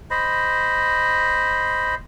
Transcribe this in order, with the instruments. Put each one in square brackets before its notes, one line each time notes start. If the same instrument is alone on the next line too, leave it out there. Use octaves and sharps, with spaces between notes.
[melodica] C5 D#5 B5